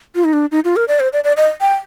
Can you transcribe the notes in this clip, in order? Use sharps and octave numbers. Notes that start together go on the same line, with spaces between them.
F4
D#4
D4
D#4
F4
A#4
D5
C5
D5
D5
D#5
G5